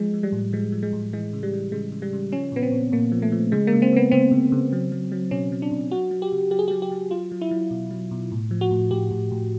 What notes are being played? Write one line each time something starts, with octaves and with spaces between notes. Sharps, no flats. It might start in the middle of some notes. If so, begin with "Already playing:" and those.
Already playing: F3 G#3
F3
G3
A2
F3 G#3
F3
G#3
A2
E3 G#3
C#3
G3
E3
C#3 G#3
C#3
G3
C#3
F3 C#4
A#2 B3
C4
A#2
A#2 A#3
F3
A3
F3
C#3 G#3
A#3
C#3
C4
C#3 B3
C#3 C4
C#3
C#3
F#3
F#3
F#3
B2 C#4
F#3
D4
B2
F#3 F#4
F#3
G4
C#3
F#3 G4
G#4
F#3 G4
G4
F#3
F#3 F4
F#3
E4
F#3
B2
F#3
B2
A2
F3
F#4
A2
A2 G4
A2
A2